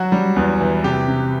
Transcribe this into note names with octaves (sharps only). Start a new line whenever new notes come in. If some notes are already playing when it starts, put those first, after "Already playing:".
Already playing: F#3 F#4
G3
E2
E3
C3 G4
C3